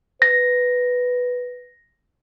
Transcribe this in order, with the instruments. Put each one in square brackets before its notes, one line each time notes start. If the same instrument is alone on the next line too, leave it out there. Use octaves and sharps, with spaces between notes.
[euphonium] B4 [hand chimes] A#6